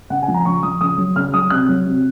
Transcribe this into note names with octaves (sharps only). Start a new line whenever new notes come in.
C#3 F#5
G#5
F3
A#5
C#3 C#6
F3 D#6
C#3 D#6
F#3
C#3 F6
F#3 D#6
C3 F#6
F#3
C3